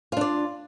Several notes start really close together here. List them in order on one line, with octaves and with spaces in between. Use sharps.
F4 D4 D5